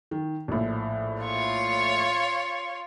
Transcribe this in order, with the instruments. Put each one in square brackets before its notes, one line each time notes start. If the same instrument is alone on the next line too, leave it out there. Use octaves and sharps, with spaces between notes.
[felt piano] D#3
A#1 A2
[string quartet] F4 C#5